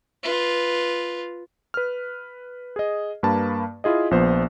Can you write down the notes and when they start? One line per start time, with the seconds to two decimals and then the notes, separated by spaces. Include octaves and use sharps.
0.23 F4 B4
1.74 B4 F6
2.76 G#4 D#5
3.23 G2 A#3 B4 A5 B5
3.84 E4 F4 G#4 D#5
4.11 A#1 F3 B3 C5